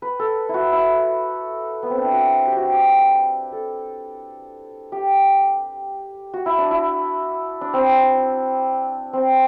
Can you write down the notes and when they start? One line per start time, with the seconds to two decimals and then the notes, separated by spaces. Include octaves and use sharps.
0.02 B4
0.19 A4
0.49 E4
0.54 F#4
0.72 E4
1.83 B3
1.90 C4
1.98 D4
2.04 E4
2.13 F#4
2.47 G4
2.56 F#4
2.66 G4
3.52 A4
4.92 G4
6.33 F#4
6.46 E4
6.58 D4
6.71 E4
7.61 D4
7.74 C4
9.13 C4